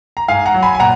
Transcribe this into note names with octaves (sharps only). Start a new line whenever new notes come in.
A#5
G#2 F5 G#5
F#5 A#5
F#3
G#5 B5
G#5
A#2 F#5 A#5